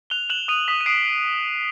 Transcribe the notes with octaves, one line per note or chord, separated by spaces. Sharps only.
F#6 F7 G7
F#6 E7 F#7
D#6 D#7 F7
D#6 B6
D#7
D#6 C7 D7